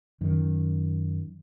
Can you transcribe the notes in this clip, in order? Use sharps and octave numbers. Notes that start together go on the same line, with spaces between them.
F#2 D#3